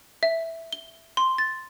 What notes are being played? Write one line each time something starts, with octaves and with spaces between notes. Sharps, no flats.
E5
G7
C6
A6